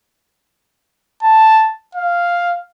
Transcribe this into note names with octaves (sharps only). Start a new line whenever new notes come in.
A5
F5